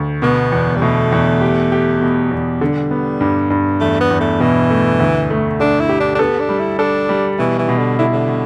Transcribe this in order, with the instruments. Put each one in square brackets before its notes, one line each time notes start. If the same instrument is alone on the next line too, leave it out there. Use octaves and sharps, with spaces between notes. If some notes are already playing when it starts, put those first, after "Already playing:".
Already playing: [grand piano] D2
[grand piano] B2 [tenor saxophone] B3
[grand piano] E2
[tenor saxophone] G3
[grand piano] B2 [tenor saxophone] A3
[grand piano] E2
G4
G4
B2
E2
[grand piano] D3 [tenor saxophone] G3
[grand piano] B3
G2
G2
[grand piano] E2 [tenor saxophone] A3
[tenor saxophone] B3
[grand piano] E2
[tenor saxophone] A3
[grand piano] B2 [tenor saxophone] E3
[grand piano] A3
D2
A3
[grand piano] D3 [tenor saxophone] D4
[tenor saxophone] E4
[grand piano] G4
[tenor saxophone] D4
D4
[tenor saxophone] B3 [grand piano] A4
[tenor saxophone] D4
[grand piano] G3
[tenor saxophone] E4
[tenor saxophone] D4 [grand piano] A4
[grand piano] G3
[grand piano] B2 [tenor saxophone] E3
[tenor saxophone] E3
[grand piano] B2
[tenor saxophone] D3
[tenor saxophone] D3 [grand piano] E4
[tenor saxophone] D3
[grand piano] B2